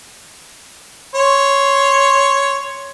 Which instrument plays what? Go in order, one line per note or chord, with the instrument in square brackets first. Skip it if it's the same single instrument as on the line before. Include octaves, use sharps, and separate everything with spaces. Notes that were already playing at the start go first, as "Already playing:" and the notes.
[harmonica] C#5 C6